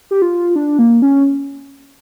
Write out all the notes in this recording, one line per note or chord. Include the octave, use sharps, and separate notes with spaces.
G4
F4
D4
A#3
C#4